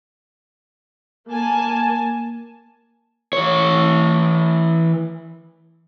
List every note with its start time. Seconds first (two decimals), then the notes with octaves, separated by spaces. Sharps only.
1.29 A#3 G#5 A5
3.33 E3 C#5